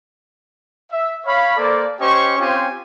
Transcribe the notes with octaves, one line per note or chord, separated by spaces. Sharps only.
E5
C#5 F5 B5
A#3 A4 C5 D5
C#4 G4 C5 D#5 C#6
C4 C#4 F4 G4 C5 G#5